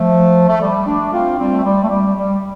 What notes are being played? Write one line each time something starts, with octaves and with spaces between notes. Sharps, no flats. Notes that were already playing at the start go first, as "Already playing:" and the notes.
Already playing: F3 A3
A3
G3
A3 D4
C4 F4
G3 C4
A3
G3
A3
G3
G3